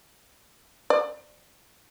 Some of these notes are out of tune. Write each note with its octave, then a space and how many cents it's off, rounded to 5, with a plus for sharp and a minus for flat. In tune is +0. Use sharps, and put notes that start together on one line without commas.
D5 +30